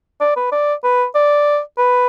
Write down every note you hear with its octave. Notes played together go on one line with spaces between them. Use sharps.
D5
B4
D5
B4
D5
B4